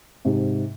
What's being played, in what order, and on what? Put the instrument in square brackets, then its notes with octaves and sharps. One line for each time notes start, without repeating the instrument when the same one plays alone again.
[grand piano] G#2 C3